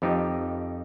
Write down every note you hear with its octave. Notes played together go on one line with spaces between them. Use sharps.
F2 F3 D#4 G4